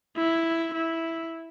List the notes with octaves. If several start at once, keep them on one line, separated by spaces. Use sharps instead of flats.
E4
E4